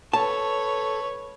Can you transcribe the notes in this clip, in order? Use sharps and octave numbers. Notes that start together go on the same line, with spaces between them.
A4 B4 C#5 A5